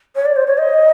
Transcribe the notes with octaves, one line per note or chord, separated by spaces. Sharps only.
C#5
D5
C5
C#5
D#5